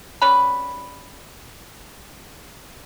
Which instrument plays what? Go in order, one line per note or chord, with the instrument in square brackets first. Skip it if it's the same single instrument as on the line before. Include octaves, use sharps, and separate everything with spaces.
[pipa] G3 C#4 B4 B5